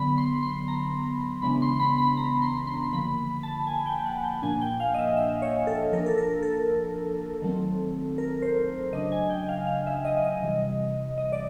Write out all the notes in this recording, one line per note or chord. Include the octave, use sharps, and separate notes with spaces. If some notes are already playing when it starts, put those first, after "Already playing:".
Already playing: D3 F#3 B3 B5
C6
C6
A#5
C#3 E3 G#3 B3 D4 B5
C6
B5
B5
A#5
C6
C6
D3 F3 A#3 B5
A5
G#5
G5
F#5
G5
A#2 F3 A#3 D4 G#5
G5
F5
D#5
E5
E5
C#5
A4
F3 A#3 D4 A#4
A4
A#4
A4
D#3 F#3 A3 C4
A#4
C5
C#3 F#3 A3 D4 D#5
G#5
G5
F5
F5
E5
D#5
D#5
C3 E3 G3
D#5
D5